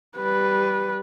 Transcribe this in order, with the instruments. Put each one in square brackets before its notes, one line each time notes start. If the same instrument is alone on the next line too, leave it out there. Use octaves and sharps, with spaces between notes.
[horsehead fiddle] G3 B4